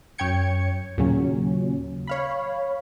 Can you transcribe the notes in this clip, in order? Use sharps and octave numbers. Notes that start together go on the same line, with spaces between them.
F#2 C#5 G5 G#6 C#7
D#2 A#2 C#3 F#3 C#4
C#5 F5 B5